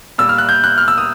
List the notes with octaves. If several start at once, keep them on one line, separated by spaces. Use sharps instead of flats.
A#2 G3 E6
F6
F#6
G6
F#6
F6
E6
D#6